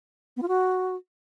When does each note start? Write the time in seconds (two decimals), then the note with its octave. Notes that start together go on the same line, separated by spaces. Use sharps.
0.37 B3
0.42 F4
0.48 F#4